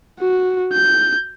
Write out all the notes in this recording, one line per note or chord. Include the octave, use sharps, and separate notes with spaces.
F#4
G6